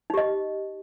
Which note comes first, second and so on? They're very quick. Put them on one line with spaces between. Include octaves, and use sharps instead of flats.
D#4 G4 D#5